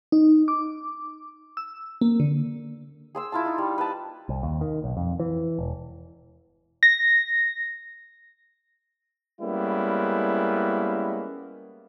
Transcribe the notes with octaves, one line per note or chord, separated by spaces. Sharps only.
D#4
D6
E6
A#3
D3
G#4 C6 E6
E4 F4 A5
D#4
G3
B4 A5
C2
D#2
D#3
B1
F2
E3
E1
A#6
G3 G#3 A#3 B3 C#4 E4